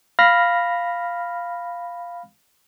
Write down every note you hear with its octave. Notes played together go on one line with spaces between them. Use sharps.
F5 B5 F6 A#6